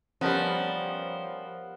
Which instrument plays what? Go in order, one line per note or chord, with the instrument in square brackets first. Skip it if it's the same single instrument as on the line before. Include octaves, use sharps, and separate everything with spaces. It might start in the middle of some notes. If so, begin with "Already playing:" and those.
[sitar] F3 [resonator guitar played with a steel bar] G3 C#4 [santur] B3 A#4